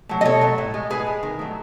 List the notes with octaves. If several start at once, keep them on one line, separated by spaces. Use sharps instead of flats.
F#3 A3
D#5
B2 A4 C#5
F#3 A3
A2
G#3
A2 G#4 B4
G#3
D#3
F#3 A3